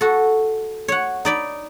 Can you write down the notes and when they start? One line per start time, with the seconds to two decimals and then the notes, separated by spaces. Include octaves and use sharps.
0.01 F#4 A4
0.88 C#5 F#5
1.25 D#4 D5 B5